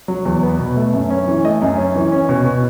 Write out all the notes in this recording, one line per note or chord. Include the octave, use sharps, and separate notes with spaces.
F#3
E2
B3
B2
A3
F#2
C#4
E3
A3 D#5
F#2
C#4
E3
C#4
B2
B2